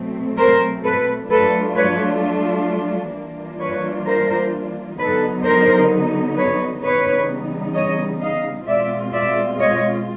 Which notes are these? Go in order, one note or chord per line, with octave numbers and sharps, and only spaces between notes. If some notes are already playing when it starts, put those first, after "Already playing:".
Already playing: B2 F#3 A3 C4
A#4 C5
A4 B4
F#3 A3 D4 F4 A4 B4
B4 C#5
E3 G3 A#3 D4 F4
B4 C#5
A#4 C5
D3 F#3 B3 D#4 A4 B4
A#4 C5
B4 C#5
C#3 E3 G3 B3 D#4 B4 C#5
C#5 D#5
D#5 F5
B2 G#3 C4 F4 D5 E5
D5 E5
C#5 D#5